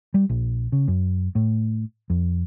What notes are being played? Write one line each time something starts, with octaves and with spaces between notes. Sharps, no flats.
G3
A#1
C#3
F#2
A2
F2